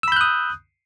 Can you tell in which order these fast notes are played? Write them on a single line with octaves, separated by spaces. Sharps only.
E6 B5 G6 F#6 D#6